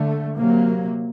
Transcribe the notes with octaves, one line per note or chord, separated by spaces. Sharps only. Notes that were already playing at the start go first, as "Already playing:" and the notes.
Already playing: D3 A3
C3 F#3 A#3